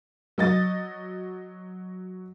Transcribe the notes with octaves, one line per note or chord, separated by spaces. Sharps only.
F#3 D#5 A6